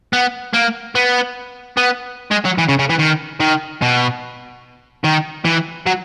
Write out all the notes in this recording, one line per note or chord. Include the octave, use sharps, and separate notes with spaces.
B3
A#3
B3
B3
G#3
F#3
E3
C#3
C#3
E3
D#3
D#3
B2
D#3
E3
F#3